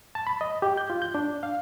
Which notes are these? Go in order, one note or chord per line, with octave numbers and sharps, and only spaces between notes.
A5
B5
D#5
G4
G6
F4
G6
D4
F5